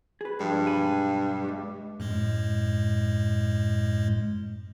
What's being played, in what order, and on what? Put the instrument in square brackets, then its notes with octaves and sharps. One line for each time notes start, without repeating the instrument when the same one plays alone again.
[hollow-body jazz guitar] G#4 B4
[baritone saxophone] G2 [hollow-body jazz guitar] F3 G#3
[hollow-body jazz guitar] B1 G#5 B5
G#3 A3 G4
[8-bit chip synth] F#2 A2 G#3